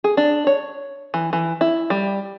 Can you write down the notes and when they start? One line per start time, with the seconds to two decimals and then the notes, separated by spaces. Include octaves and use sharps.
0.04 G#4
0.17 D4
0.47 C#5
1.14 E3
1.33 E3
1.61 E4
1.90 G3